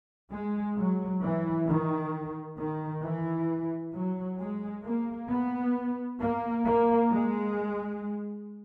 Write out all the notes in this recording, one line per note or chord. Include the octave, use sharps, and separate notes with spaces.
G#3
F#3
E3
D#3
D#3
E3
F#3
G#3
A#3
B3
A#3
A#3
G#3